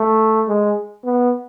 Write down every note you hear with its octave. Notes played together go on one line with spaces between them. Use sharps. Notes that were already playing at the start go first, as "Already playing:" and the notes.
Already playing: A3
G#3
B3